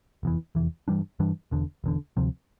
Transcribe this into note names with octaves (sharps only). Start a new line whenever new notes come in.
F1 E2 E3
F1 E2 E3
G2 E3 G3 D4
G2 E3 G3 D4
E1 E2 D3
E1 E2 D3
D2 C3 F3 C4